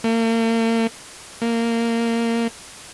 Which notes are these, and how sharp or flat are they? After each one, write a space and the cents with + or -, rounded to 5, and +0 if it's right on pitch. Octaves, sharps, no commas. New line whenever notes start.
A#3 -40
A#3 -15